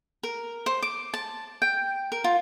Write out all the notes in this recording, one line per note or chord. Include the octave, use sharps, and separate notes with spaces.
A#4
C5
D6
A5
G5
A#4
F4